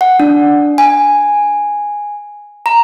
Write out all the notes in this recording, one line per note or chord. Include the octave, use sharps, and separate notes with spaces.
F#5
D4
G#5
A#5